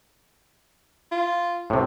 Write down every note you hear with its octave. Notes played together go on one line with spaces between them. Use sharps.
F4
A2 C3